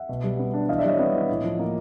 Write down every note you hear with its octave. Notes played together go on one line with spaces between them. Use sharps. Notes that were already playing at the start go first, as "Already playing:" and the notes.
Already playing: E5 F#5
B2
G3
B3
D4
E3 D#5 F5
D5 E5
G3 C#5 D#5
B3
E3
A2
F3
A#3